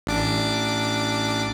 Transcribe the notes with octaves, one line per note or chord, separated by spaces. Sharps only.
A1 D4 D6